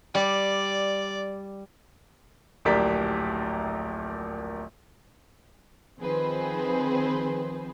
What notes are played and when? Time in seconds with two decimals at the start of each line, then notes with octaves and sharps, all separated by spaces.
0.15 G3 D5
2.65 D1 A#1 G4 A#4 D5 B6
6.00 D#3 F3 C4 G#4 B4 C5